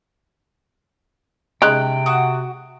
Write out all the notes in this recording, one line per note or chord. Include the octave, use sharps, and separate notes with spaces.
C3 G#3 C#4 D#4 G5 F#6
F#4 D#6